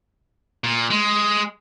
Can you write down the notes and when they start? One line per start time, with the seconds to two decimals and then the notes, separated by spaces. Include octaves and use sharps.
0.64 A#2
0.90 G#3